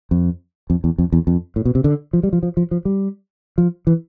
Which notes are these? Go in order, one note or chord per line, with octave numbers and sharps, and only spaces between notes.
F2
F2
E2
F2
E2
F2
A2
B2
C3
D3
F3
G3
F3
F3
F3
F3
G3
F3
E3